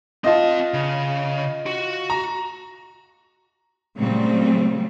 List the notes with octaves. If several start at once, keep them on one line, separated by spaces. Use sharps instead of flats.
C4 F4 D#5 A5
C#3
F#4
A#5
A#2 C#3 F#3 G3 A3 C4